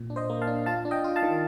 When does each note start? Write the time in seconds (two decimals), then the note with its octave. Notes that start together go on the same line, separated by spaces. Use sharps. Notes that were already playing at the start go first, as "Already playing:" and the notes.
Already playing: A#2
0.10 D4
0.16 C5 D#5
0.30 A#3
0.42 F5 A5
0.47 D4
0.66 F4 F5 A5
0.85 D4
0.91 D#5 G5
1.04 F4
1.16 F5 A5
1.23 D#3